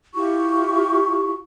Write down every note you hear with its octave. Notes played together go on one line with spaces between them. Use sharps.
E4 F4 G4 C#6